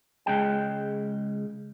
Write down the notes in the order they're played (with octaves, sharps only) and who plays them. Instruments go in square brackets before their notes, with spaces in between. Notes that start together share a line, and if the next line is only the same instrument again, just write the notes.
[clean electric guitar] C#2 C#3 G#3 G5